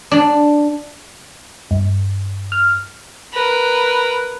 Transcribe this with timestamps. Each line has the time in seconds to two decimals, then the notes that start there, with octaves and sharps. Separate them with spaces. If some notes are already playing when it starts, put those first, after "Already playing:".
0.11 D4
1.71 G2
2.52 F6
3.33 A#4 B4